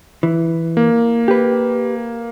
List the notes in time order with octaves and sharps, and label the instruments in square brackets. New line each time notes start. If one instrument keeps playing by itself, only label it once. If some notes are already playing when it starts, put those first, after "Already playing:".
[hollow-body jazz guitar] E3
[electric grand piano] A#3
[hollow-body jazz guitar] G4 B4